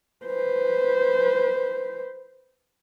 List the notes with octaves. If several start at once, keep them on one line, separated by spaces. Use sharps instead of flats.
B4 C5